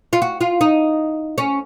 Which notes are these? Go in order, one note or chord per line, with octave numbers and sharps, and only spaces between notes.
F4
F#4
F4
D#4
C#4